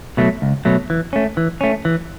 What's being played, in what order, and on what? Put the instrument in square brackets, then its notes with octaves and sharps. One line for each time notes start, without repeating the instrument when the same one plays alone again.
[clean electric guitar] B2 F#3 A3
C#2
B2 F#3 A3
E3
A3 C#4
E3
A3 C#4
E3